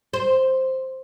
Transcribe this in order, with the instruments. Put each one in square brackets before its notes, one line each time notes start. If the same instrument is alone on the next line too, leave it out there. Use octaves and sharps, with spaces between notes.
[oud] C5